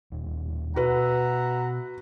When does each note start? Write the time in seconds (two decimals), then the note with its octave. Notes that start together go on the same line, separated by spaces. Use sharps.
0.12 D1 D#2
0.76 B2 F#4 B4 E5 F#5 A#5